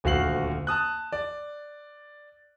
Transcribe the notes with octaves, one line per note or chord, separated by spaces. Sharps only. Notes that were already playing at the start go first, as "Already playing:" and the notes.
D#1 D2 F#4 F5 C7 F#7
A5 D#6 F#6
D5